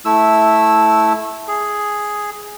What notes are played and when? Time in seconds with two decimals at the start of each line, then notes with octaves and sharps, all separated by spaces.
0.05 A3 E4 E6
1.48 G#4